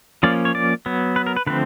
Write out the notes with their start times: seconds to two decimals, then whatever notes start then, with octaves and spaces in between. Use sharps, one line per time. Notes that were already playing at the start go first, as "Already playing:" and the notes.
0.23 F3 A#3 C#4 D5
0.45 C#5
0.55 D5
0.86 F#3 B3
1.16 B4
1.26 A#4
1.37 B4
1.47 D3 F3 A3 C4 B4